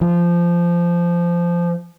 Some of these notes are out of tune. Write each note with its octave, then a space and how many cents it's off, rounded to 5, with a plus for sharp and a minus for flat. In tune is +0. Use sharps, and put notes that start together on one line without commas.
F3 -15